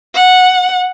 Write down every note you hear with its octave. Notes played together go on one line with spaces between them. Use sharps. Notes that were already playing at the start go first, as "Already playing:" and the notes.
F#5